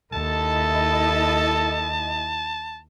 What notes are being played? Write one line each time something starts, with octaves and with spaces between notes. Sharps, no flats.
D#2 E4 A4 D#5 A5